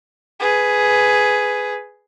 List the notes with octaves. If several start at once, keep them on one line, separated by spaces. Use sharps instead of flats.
G#4 B4